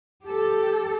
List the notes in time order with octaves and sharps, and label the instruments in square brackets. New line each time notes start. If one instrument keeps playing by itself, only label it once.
[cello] G4 A4